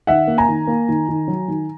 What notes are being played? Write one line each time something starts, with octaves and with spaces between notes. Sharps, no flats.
D#3 E5 F#5
A#3
G#5 A#5
D#3
A#3
D#3
D#3
F#3
D#3